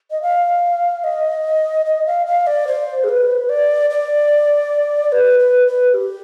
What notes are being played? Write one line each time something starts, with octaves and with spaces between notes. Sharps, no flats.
D#5
F5
D#5
D#5
F5
F5
D5
C5
G#4
B4
D5
D5
B4
B4
B4
G4